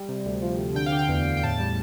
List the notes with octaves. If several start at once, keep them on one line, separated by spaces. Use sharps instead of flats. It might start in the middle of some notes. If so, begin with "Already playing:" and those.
Already playing: G3
C3
D2
F3
D2
D3 G5
F5
D3
G5
E2
E2
G5
A2 A5
G3